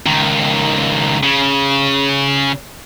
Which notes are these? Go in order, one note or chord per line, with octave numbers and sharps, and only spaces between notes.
C#2 D#3
C#3